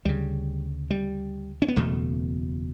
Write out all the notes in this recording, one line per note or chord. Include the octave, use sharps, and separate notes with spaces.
D2 C#3 G3
G3
C#4
B3
F#1 E2 B2 A3